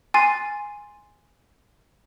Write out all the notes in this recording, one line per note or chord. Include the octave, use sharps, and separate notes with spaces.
G#5 C6 A6 C7 D#7